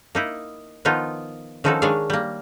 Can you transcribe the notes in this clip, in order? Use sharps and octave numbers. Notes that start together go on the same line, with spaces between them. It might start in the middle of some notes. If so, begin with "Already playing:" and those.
A#3 D#4 E4
D#3 F3 B3 D#4 F4
D#3 F3 C#4 D#4 F#4 A4
D#3 G#3 D4 C#5 D5 F5
G3 A#3